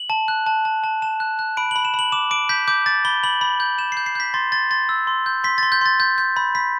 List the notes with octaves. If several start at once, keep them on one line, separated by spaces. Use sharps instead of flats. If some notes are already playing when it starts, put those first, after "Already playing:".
Already playing: F#7
A5
F#6
A5
A5
A5
A5 E7
F#6
F#6
B5 D7
B5 F#7
E7
B5
F#7
D6 E7
D6 D7
G6 B6
D6 G6
D6 A6
B5 G7
B5 F#7
B5
G6
G6 E7
G6 C7
C7
G6 B6
C6 A6
C6 A6
C6 A6
E6
C6
G6
C6 B6
C6 A6
G6
C6 A6
G6
G6
B5
B5 B6